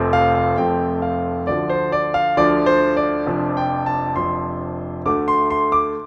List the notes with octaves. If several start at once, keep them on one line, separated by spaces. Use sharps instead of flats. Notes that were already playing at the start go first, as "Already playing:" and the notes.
Already playing: F1 F2 F3 A3 C4
F5
F5
F1 F2 F3 A3 C4 G5
F5
D2 D3 F3 D5
C5
D5
F5
D2 D3 F3 D5
C5
D5
F1 F2 F3 D4
G5
A5
F1 F2 F3 D4 C6
D2 D3 A3 D6
C6
C6
D6